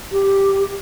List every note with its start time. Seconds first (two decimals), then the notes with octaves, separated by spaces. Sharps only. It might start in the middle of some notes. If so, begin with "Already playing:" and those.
0.12 G4